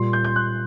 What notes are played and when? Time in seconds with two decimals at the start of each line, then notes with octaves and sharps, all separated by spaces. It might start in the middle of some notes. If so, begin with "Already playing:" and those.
Already playing: A#2 G3 C6
0.13 G6
0.24 G6
0.36 F#6